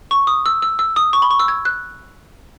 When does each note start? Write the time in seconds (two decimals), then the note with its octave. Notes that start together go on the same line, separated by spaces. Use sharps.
0.11 C#6
0.27 D#6
0.46 E6
0.62 E6
0.79 E6
0.96 D#6
1.13 C#6
1.22 B5
1.31 C#6
1.40 E6
1.48 G#6
1.65 F#6